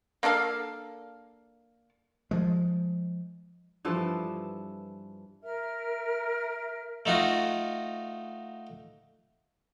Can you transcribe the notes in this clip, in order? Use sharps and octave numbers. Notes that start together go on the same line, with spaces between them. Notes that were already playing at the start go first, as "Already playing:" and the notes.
A#3 D4 A4 F5
F3 G#3
G2 E3 F3 A4
A#4 E5 F6
A3 D#4 F4 F#4